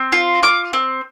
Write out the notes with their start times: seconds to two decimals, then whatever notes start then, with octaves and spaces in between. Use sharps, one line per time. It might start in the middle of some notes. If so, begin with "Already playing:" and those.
Already playing: C4
0.12 F4
0.43 F4 D6
0.73 C4